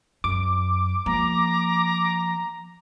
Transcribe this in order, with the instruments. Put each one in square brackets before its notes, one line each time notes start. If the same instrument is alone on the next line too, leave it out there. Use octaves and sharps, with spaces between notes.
[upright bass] F#2 [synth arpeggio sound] D6
[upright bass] F3 A#3 [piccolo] A#5